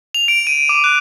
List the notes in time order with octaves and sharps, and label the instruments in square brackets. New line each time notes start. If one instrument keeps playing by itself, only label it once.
[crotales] F7
D7
D#7
D6
F#6